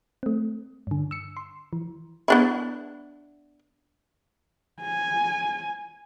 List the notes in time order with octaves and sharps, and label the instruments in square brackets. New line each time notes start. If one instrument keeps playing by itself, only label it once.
[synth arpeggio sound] A3 C4
G2 D3
E6 C#7
C6
E3
[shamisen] B3 D4 E4
[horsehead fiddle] G#5